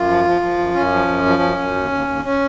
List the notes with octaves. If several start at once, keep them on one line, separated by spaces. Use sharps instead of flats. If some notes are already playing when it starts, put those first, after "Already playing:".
Already playing: F#2 F4
F3
F3
F3
F#2
F#2 C#4
F3
F#2
F3
F#2
F#2
D#2
D#2
D#2
C#4